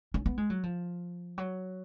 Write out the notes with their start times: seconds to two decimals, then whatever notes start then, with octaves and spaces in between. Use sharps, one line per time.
0.14 C#4
0.26 B3
0.38 G#3
0.50 F#3
0.63 F3
1.38 F#3